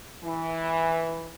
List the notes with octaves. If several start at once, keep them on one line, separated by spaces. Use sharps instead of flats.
E3